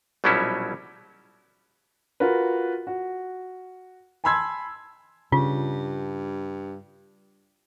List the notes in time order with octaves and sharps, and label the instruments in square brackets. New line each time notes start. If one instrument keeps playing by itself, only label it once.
[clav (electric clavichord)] A#1 B2 F#3 G3 C#4 E4
[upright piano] F4 F#4 A#4 B4
F#4
G#5 A5 B5 C6 E6 G#6
[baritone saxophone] G2 [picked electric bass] C#3 [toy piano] F4